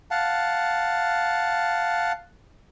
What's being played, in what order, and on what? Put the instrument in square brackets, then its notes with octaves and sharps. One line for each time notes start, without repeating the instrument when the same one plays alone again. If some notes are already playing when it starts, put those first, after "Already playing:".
[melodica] F5 F#5 A5